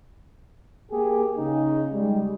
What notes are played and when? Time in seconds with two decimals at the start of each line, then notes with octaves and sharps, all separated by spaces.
0.91 A#3 G4 G#4
1.38 C#3 D#4
1.92 G3 G#3